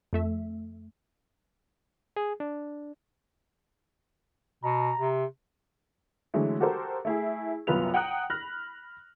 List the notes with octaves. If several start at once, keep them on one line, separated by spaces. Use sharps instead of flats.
F2 A3 E5
G#4
D4
B2 A#5
C3
D3 E3 F#3 G#3 A3
F#4 G4 A4 A#4 C5
A3 E4 G#4
C2 F#2 B3 F4 B4 F7
F#5 G5 A#5 D#6 F#6
B5 F6 F#6 A#6